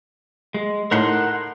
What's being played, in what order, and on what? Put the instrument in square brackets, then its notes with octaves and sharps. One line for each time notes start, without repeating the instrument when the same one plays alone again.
[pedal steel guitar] G#3
[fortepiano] A2 D#4 [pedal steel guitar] A#4 F#5 C6